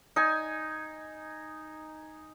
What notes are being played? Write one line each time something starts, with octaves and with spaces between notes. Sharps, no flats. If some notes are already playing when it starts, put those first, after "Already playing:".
D#4 G#5